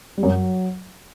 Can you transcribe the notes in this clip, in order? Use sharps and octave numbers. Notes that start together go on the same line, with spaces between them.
G3
F#2
F#3